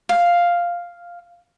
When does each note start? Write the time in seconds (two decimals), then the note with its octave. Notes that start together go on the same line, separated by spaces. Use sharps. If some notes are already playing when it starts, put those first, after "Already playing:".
0.09 F5